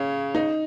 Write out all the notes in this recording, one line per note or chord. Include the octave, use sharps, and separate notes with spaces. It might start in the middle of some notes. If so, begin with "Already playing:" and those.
Already playing: C#3 C#4
D#4